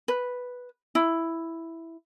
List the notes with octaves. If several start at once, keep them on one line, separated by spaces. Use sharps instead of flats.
B4
E4